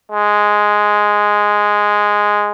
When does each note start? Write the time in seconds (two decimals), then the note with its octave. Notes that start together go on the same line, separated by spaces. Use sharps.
0.12 G#3